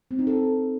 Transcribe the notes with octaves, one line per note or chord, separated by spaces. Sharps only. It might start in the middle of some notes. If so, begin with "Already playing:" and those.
C4
D#4
A4